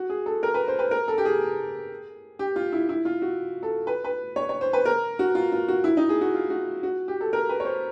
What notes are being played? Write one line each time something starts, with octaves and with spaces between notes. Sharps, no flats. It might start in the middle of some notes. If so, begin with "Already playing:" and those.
Already playing: F#4
G#4
A4
A#4
B4
C5
B4
A#4
A4
G4
G#4
G4
F4
E4
E4
F4
F#4
A4
B4
B4
C#5
C#5
C5
B4
A#4
F#4
F4
F4
F#4
E4
D#4
G#4
F#4
F4
F#4
F#4
G4
A4
A#4
B4
C#5
C5